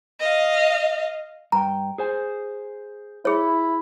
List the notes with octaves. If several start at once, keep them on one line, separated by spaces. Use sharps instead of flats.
D#5 F5
G2 G5 A#5
G#4 C5 G#5
E4 G#4 C#5